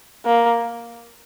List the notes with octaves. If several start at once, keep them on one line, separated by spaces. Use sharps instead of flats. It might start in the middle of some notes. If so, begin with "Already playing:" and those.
A#3